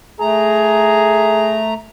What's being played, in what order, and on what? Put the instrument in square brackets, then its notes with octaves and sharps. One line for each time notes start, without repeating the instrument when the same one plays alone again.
[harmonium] A3 A#5 [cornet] G#4